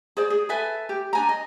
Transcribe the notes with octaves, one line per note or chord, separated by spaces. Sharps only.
G#4 C5 D5
G#4
A4 B4 E5 G#5
G4
D4 G#5 A#5
D#5